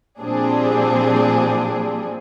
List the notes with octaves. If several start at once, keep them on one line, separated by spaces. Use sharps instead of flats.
A#2 F3 G3 C4 D4 G#4